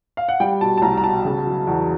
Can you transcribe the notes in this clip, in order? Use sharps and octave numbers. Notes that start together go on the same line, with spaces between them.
F5
F#5
G3 G5
B2 A5
A5
C2 A#5
A#5
B2 A5
C#3
F#3
E2